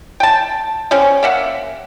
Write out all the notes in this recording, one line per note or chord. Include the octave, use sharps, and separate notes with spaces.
G5 A5
G3 C4 C#4
A#3 E5 F#5